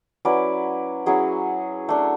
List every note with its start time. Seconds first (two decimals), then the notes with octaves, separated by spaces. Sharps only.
0.25 F#3 C#4 E4 B4 D5
1.06 F#3 C#4 E4 G#4
1.89 A3 D4